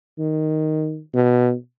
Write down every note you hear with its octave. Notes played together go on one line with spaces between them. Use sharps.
D#3
B2